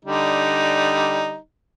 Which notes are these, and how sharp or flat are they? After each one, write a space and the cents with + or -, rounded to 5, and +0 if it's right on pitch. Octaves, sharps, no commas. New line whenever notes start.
D3 -5 G3 +0 D#4 +0